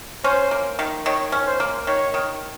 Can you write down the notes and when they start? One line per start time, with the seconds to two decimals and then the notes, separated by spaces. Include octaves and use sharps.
0.24 C#4 C5
0.51 A#3
0.79 D#3
1.06 D#3 C#5
1.32 C#4
1.47 C5
1.60 A#3
1.87 D#3 C#5
2.14 D#3